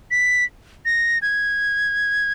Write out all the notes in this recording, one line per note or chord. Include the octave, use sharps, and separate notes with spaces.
B6
A#6
G#6